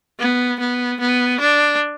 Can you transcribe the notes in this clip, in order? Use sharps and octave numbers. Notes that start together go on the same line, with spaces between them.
B3
B3
B3
D4